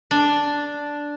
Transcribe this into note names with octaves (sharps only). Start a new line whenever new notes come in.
D4